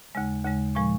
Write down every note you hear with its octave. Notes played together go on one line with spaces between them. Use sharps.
D#2 C#3 G#3
D#2 C#3 G#3
A#2 F3 G#3 C#6